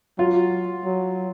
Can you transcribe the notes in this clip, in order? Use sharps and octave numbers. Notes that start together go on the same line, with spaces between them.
F#3 F4
F#3